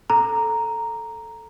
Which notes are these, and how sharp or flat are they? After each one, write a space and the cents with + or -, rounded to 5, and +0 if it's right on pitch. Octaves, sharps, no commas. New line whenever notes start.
A4 +0 A#5 +0